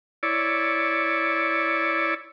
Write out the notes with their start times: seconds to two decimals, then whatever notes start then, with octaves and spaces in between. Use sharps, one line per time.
0.23 E4 C#5 D5